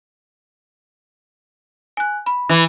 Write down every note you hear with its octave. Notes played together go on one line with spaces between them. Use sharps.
G#5 F#6
B5
E3